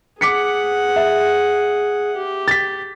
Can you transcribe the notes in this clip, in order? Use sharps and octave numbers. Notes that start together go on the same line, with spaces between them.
G#4 F#5 D6 B6 C#7
E5
G4
A6 B6